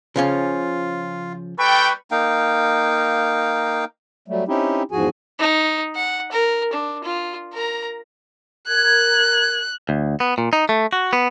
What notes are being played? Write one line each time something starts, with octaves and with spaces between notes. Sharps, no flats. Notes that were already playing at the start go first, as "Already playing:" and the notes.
C#3 F3 C#4 F4
G3 A4 B4 G5 B5 C#6
A#3 D#4 F5 G5
F#3 G3 A3
C4 C#4 D#4 E4 G4
E2 G#2 F3 F#4 G#4 G#5
D#4
F#5
A#4
D4
F4
A#4 A#5
A#4 F#6 G#6
D2
B3
A#2
D#4
A3
F#4
B3